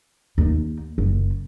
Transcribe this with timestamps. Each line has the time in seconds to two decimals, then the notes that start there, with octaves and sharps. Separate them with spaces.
0.38 D#2 D#4
0.98 F#1